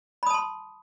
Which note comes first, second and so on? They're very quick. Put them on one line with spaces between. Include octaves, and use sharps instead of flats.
B5 D#6 A5 C6